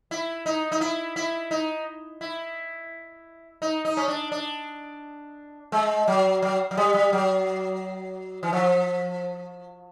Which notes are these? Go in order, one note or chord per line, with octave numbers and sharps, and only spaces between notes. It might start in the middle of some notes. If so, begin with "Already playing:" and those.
E4
D#4
D#4
E4
E4
D#4
E4
D#4
D#4
C#4
D4
D4
G#3
F#3
F#3
F#3
G3
G3
F#3
E3
F3